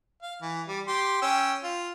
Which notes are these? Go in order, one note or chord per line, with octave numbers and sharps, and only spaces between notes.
F5
E3
G3
G4 C6
C#4 G5 E6
F4